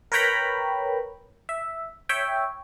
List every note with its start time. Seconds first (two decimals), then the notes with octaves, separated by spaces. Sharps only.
0.12 A#4 B4 C#5 G5 A#5 B5
1.49 E5
2.09 C#5 E5 G5